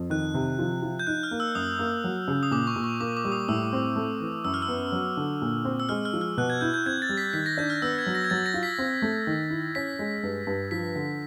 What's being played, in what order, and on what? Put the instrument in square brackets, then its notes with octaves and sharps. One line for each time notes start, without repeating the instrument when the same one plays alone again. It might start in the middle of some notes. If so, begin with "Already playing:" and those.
Already playing: [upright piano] F2
[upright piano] D#3 [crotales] F#6
[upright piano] C3
F3
F3
[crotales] G6
[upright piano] D#4 [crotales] F#6
[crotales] F6
[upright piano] A#3
[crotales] E6
[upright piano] F#2 [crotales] D#6
[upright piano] A#3
F#3
C#3
[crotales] D#6
[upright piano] A#2 [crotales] D6
[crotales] C#6
[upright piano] A#2
[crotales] C#6
[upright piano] A#3 [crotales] D6
[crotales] D6
[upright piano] G3
[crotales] D#6
[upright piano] A2 [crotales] E6
[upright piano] C4
A3
E3
[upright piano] F#2 [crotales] E6
[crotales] F6
E6
[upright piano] B3
F#3
D3
A#2
C4
[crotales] E6
[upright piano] G#3 [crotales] F6
[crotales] F6
[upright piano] F3
[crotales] F6
[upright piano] B2 [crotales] F#6
[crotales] G#6
[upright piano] E4 [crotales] G6
[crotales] G6
[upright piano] C4 [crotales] G#6
[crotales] A6
[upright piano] G3
[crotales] B6
[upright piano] D#3 [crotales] B6
[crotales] A#6
[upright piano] D4 [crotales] G6
[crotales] F6
[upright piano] B3 [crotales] E6
[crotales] G#6
[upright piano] F#3
[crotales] A#6
G#6
[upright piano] F#3 [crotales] A6
[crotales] A#6
[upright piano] F4
[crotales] B6
[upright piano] C4
A3
D#3
E4
[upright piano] C#4 [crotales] B6
[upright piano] G#3
G2
G2
[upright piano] F3 [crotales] B6
[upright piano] D3